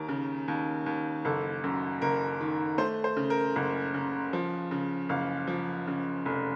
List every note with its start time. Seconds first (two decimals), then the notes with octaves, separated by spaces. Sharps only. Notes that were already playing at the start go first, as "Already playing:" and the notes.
Already playing: D#2 A#4
0.08 C#3
0.48 D#2
0.86 D#2
1.25 F#1 A4
1.64 F#2
2.02 F#1 A#4
2.41 D#3
2.78 A3 C5
3.04 C5
3.16 C#3
3.30 A#4
3.56 F#1
3.94 C#3
4.33 F3
4.71 C#3
5.09 F#1 F5
5.48 F3
5.87 C#3
6.25 F1